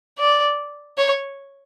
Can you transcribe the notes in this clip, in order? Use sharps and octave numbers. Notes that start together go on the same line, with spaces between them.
D5
C#5